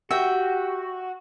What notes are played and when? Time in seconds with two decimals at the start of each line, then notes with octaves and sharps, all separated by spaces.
0.11 F#4 G4 E5 G5